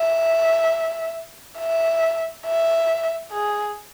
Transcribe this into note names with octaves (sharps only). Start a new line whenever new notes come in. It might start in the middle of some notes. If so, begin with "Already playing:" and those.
Already playing: E5
E5
E5
G#4